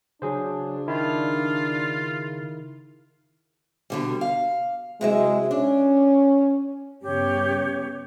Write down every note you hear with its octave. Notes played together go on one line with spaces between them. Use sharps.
C#3 F#3 D4 G#4 C5
D#3 E4 F4
B2 D3 G3
F5
C3 F#3 G#3 E4
C#4 D4
G2 C#3 B3 G4 C#5